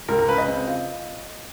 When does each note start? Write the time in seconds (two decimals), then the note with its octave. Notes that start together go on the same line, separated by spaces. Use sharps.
0.08 C#2 A#4
0.19 A#4
0.29 C#3 B4
0.38 D#5
0.48 C4
0.67 F4